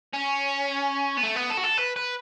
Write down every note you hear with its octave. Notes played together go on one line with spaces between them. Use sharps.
C#4
B3
A3
B3
A4
F#4
A4
B4
B4